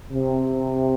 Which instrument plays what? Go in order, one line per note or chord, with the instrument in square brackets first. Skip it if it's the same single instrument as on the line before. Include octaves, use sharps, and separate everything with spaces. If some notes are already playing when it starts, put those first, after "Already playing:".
[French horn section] C3